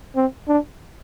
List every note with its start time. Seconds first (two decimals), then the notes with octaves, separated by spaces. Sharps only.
0.16 C4
0.48 D4